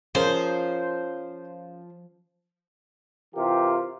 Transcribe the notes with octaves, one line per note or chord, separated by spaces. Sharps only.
F3 C#4 G#4 A#4 C5
C3 E3 F4 G4 A#4